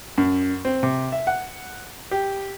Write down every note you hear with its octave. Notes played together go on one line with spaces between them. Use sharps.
F#2
C4
C3
E5
F#5
G4